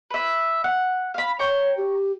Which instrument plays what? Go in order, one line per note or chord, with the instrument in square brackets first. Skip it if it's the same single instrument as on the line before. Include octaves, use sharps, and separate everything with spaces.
[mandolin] B4 E5
F#5
F5 B5
[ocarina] C#5 [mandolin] G5 A#5 C#6
[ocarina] G4